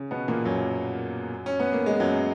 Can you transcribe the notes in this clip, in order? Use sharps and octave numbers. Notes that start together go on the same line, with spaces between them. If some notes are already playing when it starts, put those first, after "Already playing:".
Already playing: C#3
B2 B3
A#2 A#3
F#2 F#3
C#4
B3
A#3
G#3
F#2 F#3